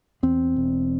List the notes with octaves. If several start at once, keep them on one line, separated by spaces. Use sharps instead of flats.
E2 C4
E1